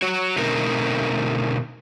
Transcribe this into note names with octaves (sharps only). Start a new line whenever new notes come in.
F#4 C#5
B2 D3 A3 C4 D#4 A#4